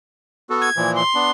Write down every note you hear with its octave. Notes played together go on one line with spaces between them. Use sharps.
B3 F#4 A4
G#6
A#2 E3 F3
C6
B3 D4